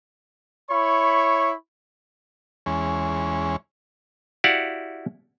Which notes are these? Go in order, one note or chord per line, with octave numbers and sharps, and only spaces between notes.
E4 C#5 B5 C#6
E2 G#3 C#4
E4 F#4 G4 D5 F5 F#5